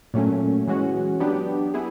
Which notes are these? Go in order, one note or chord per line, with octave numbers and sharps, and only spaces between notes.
A#2 F#3 A3 C#4
E3 G#3 C#4 F#4
F#3 B3 D4 G4
B3 E4 G#4